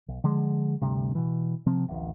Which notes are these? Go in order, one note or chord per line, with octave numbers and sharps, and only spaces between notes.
B1
D3 F3 G#3
D2 G2 C3
B2 E3
C3 F3 C4
D1 A1